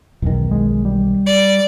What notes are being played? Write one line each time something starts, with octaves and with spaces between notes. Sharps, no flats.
B1 E2 D#3
G#3
G3
D5